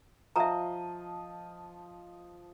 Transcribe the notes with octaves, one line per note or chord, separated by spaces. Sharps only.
F3 D#5 E5 A#5